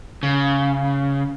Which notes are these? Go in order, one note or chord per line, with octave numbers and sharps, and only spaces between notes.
C#3